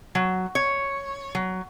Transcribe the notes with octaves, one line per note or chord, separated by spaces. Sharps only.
F#3
C#5
F#3